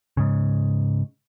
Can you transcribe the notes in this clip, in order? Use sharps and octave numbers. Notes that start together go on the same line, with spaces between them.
G#2 C#3